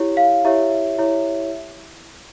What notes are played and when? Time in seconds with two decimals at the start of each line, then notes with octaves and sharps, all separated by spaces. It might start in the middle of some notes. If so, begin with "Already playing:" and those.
Already playing: E4 G4 C#5
0.17 F5
0.45 E4 G4 C#5 E5
0.98 E4 G4 C#5